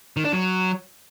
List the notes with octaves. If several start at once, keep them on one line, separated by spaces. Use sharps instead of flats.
D#3
D4
F#3